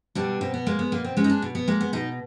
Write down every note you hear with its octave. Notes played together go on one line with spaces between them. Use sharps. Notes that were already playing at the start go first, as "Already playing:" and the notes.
B2 G3 D4
B2 C4
B3
G#3 A#3
B3
B2 A#3
C4
G#3 C#4
D#4
D4
B2
B3
G#3 A#3
B3
B2 D#4